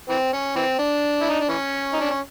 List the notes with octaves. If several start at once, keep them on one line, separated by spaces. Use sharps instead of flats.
E3 C4
C#4
E3 C4
D4
E4
D#4
D4
E3 C#4
D#4
D4
C#4